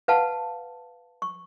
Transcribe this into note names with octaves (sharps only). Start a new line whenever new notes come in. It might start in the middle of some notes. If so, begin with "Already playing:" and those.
B4 F5 F#5 A5
C#6